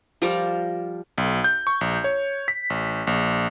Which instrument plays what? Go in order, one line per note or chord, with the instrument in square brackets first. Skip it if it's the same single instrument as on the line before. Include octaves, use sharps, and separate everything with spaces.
[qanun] F3 G3 A#4 D5
[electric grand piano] B1
G6
C#6
A#1
C#5
B6
A1
A#1